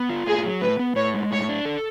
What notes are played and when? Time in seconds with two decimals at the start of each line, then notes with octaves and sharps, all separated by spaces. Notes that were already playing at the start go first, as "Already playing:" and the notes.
Already playing: B3
0.09 F4
0.27 A2 G#4
0.45 F#3
0.61 A2 B4
0.79 B3
0.96 A2 C#5
1.14 G#3
1.31 A2 C#5
1.49 D4
1.65 A4